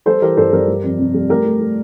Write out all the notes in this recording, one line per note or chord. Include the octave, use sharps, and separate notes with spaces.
G3 A4 C5
E3 G4 A#4
G2 A4 C5
G2 G4 A#4
G3
F2
C3
G3
A3 G4 A#4
A3
A3